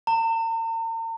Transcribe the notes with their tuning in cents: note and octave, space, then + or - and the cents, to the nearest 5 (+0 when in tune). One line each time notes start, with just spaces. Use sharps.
A#5 -45